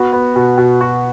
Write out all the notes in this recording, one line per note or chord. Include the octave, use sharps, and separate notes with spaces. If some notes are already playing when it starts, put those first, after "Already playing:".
Already playing: B3 F#4
B3
B2
B2
F#4